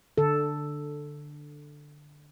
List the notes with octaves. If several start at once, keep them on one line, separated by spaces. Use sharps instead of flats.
D3 A4